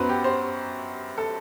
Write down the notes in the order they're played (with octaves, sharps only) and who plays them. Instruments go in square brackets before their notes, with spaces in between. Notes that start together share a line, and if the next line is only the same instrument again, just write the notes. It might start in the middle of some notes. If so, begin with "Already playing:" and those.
Already playing: [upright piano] F#2 F#3 B3 B4 C5
G4
C5
A4